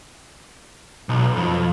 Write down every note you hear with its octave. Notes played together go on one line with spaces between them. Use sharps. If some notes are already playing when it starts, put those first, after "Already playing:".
B1
F2